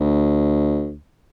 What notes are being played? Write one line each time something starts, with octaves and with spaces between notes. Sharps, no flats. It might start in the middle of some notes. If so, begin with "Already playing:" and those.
D2